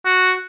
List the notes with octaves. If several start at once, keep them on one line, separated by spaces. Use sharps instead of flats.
F#4